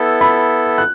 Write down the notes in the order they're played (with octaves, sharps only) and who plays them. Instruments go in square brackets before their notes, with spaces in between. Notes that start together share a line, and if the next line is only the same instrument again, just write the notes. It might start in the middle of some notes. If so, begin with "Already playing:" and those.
Already playing: [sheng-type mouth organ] B3 E4 A4
[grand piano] B5
F#6